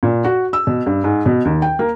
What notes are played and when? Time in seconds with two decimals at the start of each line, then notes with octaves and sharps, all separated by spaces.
0.03 A#2
0.24 F#4
0.53 E6
0.67 B2
0.86 G2
1.04 G#2
1.26 B2
1.45 D#2
1.62 G5
1.79 A#3